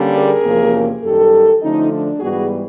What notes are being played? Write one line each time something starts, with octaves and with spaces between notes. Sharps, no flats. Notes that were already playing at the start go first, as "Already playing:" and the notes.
Already playing: D3 G3 A#3 C#4
G#4 A#4
E2 C3 F3 A#3 C#4
F#2 D#3 G3 G4 A4
D3 F3 A3 C#4 D#4
D4
G#2 E3 G3 B3 F#4 G#4